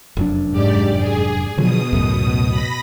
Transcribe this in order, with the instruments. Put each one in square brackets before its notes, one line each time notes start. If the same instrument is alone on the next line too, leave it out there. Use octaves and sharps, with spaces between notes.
[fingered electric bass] F1 F#2 D4
[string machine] G#2 G4 D5
G#4
[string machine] B2 D#6 [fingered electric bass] D3 F3 F#3
[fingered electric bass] C#2 F#2 A2
[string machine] B5 A#6